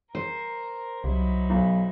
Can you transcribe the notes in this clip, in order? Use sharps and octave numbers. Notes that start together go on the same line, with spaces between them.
A#4 C5
C2 F#3 D#4 E4
B1